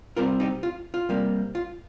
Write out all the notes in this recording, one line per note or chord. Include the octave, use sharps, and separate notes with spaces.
C3 G3 C4 F4 A#4
D#4 G4
F4
F4
C3 G3 A#3
F4